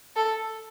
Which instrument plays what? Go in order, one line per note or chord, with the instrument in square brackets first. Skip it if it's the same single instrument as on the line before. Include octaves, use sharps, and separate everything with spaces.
[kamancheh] A4